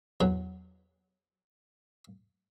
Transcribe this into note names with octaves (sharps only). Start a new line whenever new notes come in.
E2 F#3